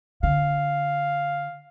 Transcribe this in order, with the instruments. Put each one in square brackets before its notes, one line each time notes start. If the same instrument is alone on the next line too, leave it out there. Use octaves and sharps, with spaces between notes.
[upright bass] D3 [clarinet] F5